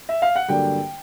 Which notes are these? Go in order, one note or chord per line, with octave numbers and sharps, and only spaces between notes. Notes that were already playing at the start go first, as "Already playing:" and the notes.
E5
F5
F#5
G2 D3 F#3 A#3 D4 G5